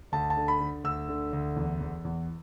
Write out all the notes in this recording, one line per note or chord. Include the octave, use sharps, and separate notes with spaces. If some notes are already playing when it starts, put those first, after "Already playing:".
D2 A5
A5
D3
B5
D3
D2 E6
D3
D2
E2
E2
E2